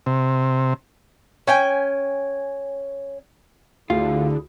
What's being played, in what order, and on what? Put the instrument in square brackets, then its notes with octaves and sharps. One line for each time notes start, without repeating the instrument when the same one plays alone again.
[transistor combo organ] C3
[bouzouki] C#4 G5 G#5
[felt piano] D2 [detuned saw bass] D3 [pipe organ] E4 G#4 [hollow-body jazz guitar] F4